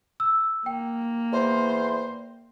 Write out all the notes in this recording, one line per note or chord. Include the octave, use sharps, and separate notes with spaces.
E6
A#3 G5
E2 C5